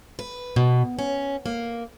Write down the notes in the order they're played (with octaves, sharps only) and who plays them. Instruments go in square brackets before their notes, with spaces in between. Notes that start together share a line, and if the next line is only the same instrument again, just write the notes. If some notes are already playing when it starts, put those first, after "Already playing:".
[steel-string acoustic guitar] B4
B2
C#4
A#3